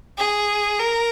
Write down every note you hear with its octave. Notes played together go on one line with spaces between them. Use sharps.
G#4
A#4